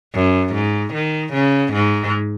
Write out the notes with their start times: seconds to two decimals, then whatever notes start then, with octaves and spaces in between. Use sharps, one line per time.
0.14 F#2
0.53 G#2
0.94 D#3
1.33 C#3
1.73 G#2